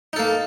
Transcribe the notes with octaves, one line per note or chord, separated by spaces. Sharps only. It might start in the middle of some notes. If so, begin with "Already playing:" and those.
A#3 D#4 A4